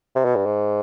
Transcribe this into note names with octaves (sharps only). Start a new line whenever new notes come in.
C3
B2
G2
G#2